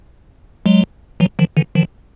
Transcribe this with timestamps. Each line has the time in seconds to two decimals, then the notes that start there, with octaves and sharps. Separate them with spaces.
0.66 F#3 G#3
1.20 E3 F#3
1.39 D#3 F3
1.57 D3 E3
1.75 D#3 F3